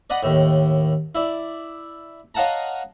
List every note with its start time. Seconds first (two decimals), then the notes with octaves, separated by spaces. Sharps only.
0.10 D5 D#5 F#5 B5
0.23 D#2 A2
1.15 E4 D5
2.35 C#5 D#5 F5 F#5 A5 A#5